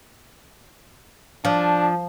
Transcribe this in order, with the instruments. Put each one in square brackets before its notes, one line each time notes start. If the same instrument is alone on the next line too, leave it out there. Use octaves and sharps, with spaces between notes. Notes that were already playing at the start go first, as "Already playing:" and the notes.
[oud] F3 [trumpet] D4